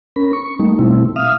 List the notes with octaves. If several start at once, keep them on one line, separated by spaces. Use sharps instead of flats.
C#4 A#4 B5
C#6
G3 A3 A#3 D#4
B2 G3 A3 C4 E4
E5 F5 D#6 F6